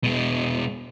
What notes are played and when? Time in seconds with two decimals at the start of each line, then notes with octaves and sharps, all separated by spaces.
0.04 B2 G#3